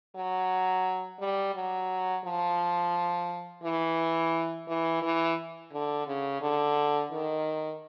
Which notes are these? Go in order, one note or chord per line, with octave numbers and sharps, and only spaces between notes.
F#3
G3
F#3
F3
E3
E3
E3
D3
C#3
D3
D#3